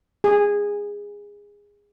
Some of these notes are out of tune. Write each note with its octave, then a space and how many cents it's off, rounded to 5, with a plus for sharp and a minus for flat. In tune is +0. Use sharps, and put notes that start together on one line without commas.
G#4 -20